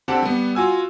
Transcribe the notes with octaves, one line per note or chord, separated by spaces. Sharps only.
D3 C4 G4 F#5 A5
G3 B3
F4 F#4 G#5 E6